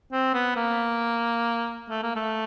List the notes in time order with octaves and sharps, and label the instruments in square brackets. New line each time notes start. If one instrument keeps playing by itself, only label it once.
[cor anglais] C4
B3
A#3
A3
A#3
A3